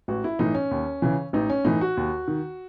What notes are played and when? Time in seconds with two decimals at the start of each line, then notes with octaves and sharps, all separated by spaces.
0.08 A1 F#4
0.24 E4
0.39 A2 E3 D#4
0.55 C#4
0.71 D#2
1.02 C#3 E3
1.33 A1 D#4
1.50 C#4
1.65 A2 E3 D#4
1.81 F#4
1.97 D#2
2.28 D#3